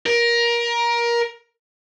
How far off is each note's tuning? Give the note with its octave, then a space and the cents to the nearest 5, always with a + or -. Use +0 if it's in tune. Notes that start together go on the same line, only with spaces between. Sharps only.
A#4 +20